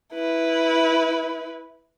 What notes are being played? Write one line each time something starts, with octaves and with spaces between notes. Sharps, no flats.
E4 B4